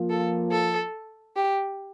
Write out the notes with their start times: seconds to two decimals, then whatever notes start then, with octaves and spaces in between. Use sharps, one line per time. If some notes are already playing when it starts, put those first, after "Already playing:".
Already playing: F3 A#3 F4
0.10 A4
0.52 A4
1.36 G4